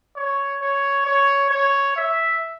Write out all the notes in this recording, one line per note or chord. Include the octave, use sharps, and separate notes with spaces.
C#5
C#5
C#5
C#5
E5